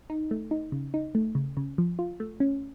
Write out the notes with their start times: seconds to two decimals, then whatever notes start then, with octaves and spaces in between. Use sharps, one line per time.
0.10 D#4
0.31 A3
0.51 D#4
0.72 C#3
0.94 D#4
1.15 A3
1.35 C#3
1.57 C#3
1.78 F3
1.99 F4
2.20 A3
2.40 C#4